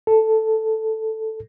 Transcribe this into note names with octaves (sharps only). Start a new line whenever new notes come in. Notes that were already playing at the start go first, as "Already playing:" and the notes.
A4